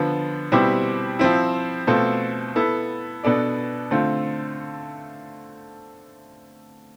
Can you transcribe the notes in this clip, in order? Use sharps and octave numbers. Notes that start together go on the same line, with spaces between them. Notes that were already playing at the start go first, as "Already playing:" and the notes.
Already playing: D3 F3 B3
B2 G3 C4 E4 G4
F3 C4 E4
B2 A3 C4 F4 A4
B3 E4 A4
B2 B3 D4 A4 D5
D3 A3 C4 F4